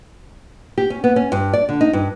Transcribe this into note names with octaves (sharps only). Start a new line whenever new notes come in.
G4
C#4
B3
C#4
G2
D5
D3
D#4
G2